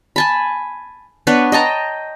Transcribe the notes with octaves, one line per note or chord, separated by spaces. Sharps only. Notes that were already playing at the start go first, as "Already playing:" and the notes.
G#5 A5 B5
B3 D4 B4 C#5
D#5 G5 A5 A#5